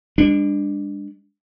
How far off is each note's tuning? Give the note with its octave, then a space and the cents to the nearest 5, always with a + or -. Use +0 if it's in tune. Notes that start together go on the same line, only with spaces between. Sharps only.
G#3 -45 D4 +0